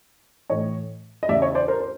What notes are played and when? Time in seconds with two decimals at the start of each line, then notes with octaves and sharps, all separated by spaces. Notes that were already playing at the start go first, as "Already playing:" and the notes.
0.50 A2 E3 C#5 D#5
1.23 D#5
1.29 E2 C#3 E3 D5 E5
1.42 C#5 D#5
1.55 C5 D5
1.68 A#4 C5
1.80 C5